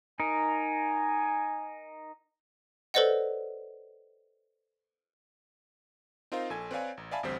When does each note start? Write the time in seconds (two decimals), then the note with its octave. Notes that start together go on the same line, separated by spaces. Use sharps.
0.20 D#4 A#4 G#5
2.94 A4 B4 C5 D5 D#5 F#5
6.32 C4 D#4 F4 A#4 C5 F5
6.50 A#1 A4 G#5 G#6
6.71 C4 B4 C#5 D5 F5 G#5
6.97 A1
7.11 D5 E5 F5 G#5 A5 B5
7.23 A1 D2 G3 C4 C5 B6